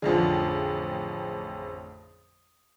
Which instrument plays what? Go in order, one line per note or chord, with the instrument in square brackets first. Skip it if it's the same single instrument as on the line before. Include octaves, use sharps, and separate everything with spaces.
[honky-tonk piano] A1 F2 G#4 [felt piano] D3 F3